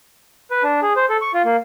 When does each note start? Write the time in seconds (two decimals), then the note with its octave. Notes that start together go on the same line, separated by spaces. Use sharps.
0.51 B4
0.63 D4
0.82 G#4
0.96 C5
1.10 A4
1.22 C#6
1.34 F4
1.45 A#3